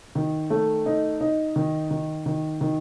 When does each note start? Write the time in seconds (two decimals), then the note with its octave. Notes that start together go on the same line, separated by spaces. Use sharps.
0.15 D#3
0.50 A3
0.86 D#4
1.21 D#4
1.56 D#3
1.91 D#3
2.26 D#3
2.61 D#3